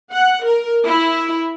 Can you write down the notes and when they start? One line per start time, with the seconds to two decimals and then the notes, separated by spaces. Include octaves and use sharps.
0.13 F#5
0.45 A#4
0.85 E4